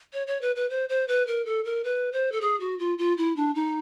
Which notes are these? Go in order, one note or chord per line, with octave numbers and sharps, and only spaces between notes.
C#5
C#5
B4
B4
C5
C5
B4
A#4
A4
A#4
B4
C5
A4
G#4
F#4
F4
F4
E4
D4
D#4